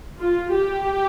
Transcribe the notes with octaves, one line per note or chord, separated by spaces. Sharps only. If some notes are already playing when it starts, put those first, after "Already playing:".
F4
G4